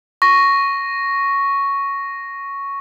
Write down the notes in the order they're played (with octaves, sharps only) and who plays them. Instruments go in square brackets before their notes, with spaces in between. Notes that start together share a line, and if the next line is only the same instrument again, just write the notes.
[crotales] C#6 A#6